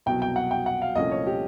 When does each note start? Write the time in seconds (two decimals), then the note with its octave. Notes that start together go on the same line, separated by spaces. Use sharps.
0.06 C2 B2 F#3 G5
0.22 G5
0.36 F#5
0.51 G5
0.66 F#5
0.82 F5
0.96 C2 A#2 F3 A3 C#4 D#5
1.11 C#5
1.27 G4